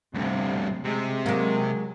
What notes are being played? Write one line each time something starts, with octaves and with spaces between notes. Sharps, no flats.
D2 G2 C3
C3 G#3
F#3 G#3 A#3